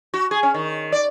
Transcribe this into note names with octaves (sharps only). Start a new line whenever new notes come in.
F#4
G#4
C#4
D#3
D5